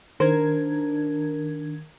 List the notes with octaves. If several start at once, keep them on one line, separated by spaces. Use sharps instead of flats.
D#3 D4 A#4 C5 G#6